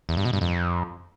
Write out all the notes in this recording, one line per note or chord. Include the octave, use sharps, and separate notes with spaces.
E2
G2
B2
G2
F2